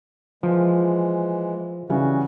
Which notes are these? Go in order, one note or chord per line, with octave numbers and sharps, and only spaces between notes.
E3 F3 G#3
C#3 E3 G3 F#4